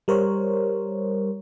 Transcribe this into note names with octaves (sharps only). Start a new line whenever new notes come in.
G3 A#4 C5 C#5